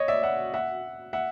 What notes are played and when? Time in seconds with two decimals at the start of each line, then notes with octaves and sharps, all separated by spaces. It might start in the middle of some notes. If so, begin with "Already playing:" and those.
Already playing: C#5 D#5
0.08 D5 E5
0.23 E5 F#5
0.54 E5 F#5
1.13 E5 F#5